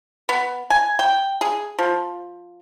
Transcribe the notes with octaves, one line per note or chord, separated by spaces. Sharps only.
B3
G#5
G5
G#4
F3